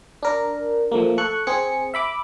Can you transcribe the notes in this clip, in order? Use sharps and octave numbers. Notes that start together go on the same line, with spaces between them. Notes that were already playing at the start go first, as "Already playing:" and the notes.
D4 A#4
F3 A3 A#3
A4 C#6 F#6
C4 G#4 C#7
E5 B5 D6